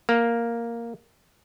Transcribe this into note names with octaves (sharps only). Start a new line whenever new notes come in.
A#3